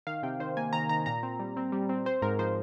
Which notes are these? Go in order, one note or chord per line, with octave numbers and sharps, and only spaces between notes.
D#3 F5
C3 G5
D#3 C5
A#3 G#5
D#3 A#5
D#3 A#5
A#2 A#5
C4
G3
C4
G3
C4
C4 C5
G#2 A#4
F3 C5